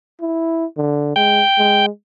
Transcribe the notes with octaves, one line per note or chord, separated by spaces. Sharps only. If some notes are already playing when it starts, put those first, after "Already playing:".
E4
D3
G#3 G5
G#3